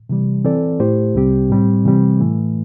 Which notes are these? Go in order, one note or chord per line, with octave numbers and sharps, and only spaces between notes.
C3 E3 G3
E3 C4 A4 D5
A2 A3 E4 G4 C5
C2 C3 G3 C4 G4
A2 G3 C4
C3 E3 G3 C4
A2 E3 A3